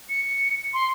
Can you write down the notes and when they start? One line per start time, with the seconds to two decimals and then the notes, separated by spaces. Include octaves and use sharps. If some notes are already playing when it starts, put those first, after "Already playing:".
0.09 C#7
0.74 C6